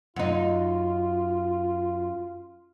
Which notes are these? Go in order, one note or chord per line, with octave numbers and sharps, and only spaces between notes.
F#2 D#4 F4